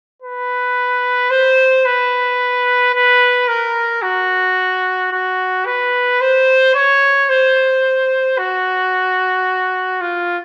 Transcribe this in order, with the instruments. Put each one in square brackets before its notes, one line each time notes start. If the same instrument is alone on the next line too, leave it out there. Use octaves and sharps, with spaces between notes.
[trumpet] B4
C5
B4
B4
A#4
F#4
F#4
B4
C5
C#5
C5
F#4
F4